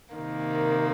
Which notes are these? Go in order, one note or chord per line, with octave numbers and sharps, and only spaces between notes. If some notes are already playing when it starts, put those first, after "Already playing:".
C3 D#3 A#3